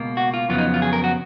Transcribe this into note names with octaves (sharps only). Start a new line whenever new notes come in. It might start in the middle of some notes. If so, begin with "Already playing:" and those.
Already playing: C#2 B2 A#3
F#4
F4
F2 C#3 F#3 B3 F4
D#4
F4
G#4
A#4
F#4